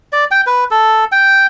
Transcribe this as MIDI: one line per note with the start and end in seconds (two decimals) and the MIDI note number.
0.13 0.25 74
0.31 0.41 79
0.46 0.64 71
0.71 1.05 69
1.12 1.47 79